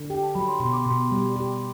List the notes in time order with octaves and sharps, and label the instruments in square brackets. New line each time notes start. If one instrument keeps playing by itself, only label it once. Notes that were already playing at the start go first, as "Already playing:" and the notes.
Already playing: [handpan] D3
[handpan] G4 [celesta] G5
[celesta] A5
[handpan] F#3 [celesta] B5
[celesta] C6
[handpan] B2 [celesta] C6
[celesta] D6
[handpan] B2 [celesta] C6
[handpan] G3
G4